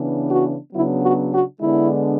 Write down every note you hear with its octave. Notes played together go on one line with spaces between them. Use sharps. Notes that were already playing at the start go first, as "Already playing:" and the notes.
Already playing: C#3 E3 B3 D4
F#4
C#3 F#3 B3 D4 E4
F#4
F#4
D3 G#3 B3 D4 E4